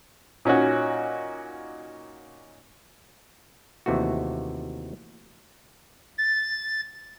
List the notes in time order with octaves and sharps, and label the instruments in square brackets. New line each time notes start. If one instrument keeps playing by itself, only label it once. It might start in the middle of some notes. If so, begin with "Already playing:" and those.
[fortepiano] A#2 C#4 D#4 F#4
[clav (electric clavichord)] D#2 C3 E3 A3 F#4
[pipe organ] A6